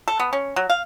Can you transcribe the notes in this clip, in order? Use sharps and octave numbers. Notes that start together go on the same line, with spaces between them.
A4
B3
C#4
F#3
F5